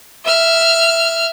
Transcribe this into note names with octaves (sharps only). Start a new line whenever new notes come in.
E5 F6